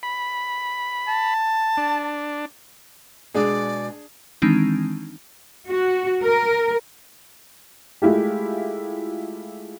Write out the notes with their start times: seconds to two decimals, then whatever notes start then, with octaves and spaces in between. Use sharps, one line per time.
0.03 B5
1.08 A5
1.77 D4
3.34 B2 G#3 D4 G#4 D5
4.42 D#3 E3 G#3 C4 D4 D#4
5.68 F#4
6.22 A#4
8.02 G#3 A3 E4 F4 G4